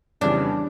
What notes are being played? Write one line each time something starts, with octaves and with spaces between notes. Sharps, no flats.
F2 C#3 E3 G3 B3 D4